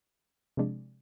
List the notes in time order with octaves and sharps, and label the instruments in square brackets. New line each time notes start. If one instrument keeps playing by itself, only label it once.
[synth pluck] C3 F3 G#3 D4